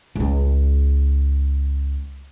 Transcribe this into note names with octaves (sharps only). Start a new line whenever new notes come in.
C#2 G#3